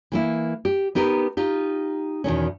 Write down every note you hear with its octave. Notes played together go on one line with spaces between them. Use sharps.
E3 A#3 E4
G4
B3 D#4 G4 A#4 B4
D#4 F4 G4
E2 B2 D#3 C#4